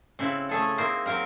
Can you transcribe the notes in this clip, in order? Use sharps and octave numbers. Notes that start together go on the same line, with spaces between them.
C#3 C4 E4
A3 G#4 A4
A#3 C4 D#4 E4 C5
F#3 C4 A#4 F5